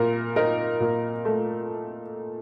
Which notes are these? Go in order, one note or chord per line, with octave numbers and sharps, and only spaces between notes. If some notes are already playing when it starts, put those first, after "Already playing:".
Already playing: A#2 A#4
D#4 A#4
A#2
A3